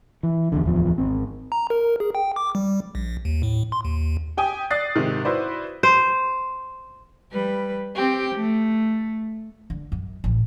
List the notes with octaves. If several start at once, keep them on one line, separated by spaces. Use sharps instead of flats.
E3
E2 G2 D3
D1 E2 F3
G#1 C4
A#5
A#4
G#4
G5
D6
G3
A#1
D#2
A2
C6
D#2
G4 G5 G#5 D#6
D5 D#6 F#6 A6 C7
G#2 C3 D#3
E4 F#4 B4 C5 D5
C5
G3 B4
C4 G4
A3
D3
F#2
A1